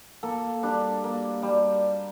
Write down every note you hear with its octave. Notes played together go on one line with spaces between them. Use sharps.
A#3 A4
G3 D4
A#3
G3